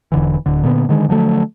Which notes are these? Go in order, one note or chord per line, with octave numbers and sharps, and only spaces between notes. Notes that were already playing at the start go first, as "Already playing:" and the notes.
E1 D3 E3
D1 D3
A#2 D3 B3
D3 D#3 G#3
D3 F3 F#3 A3